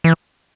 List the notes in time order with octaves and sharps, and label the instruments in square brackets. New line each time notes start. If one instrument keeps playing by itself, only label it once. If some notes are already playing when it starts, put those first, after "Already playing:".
[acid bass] E3